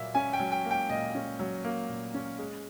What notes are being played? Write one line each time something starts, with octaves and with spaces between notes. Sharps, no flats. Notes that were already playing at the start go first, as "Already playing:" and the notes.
Already playing: A#2 F#3 A#3 E5
C#4 G#5
G5
F#3
G5
A#3
G5
A#2 D#5
C#4
F#3
A#3
A#2
C#4
G#3